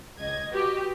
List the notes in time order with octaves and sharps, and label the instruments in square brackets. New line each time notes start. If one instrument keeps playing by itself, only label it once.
[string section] C#2 D#5 G#6
[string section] F#4 B4 D#5 [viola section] G4